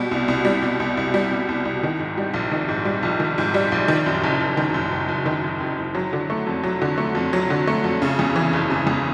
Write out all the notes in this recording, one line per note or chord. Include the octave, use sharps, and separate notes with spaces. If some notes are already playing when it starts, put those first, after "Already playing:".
Already playing: B2 G3
C2
C2
G3
B2
C2
C2
G3
B2
C2
C2
D#3
G#2
G3
A#1
D#3
G#2
G3
A#1
D#3
G#2
G3
A#1
D#3
F#2
F#1
F#1
D#3
F#2
F#1
F#1
D#3
F#2
F#1
F#1
F#3
D3
A3
F2
F#3
D3
A3
F2
F#3
D3
A3
F2
C#3
E2
E3
F#1
C#3
E2